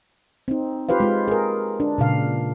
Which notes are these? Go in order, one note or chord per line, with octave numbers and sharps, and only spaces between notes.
C4 D#4
F4 G4 B4 C5 F5
G#3 F4
G#4 A#4
D4
A#2 C#3 F5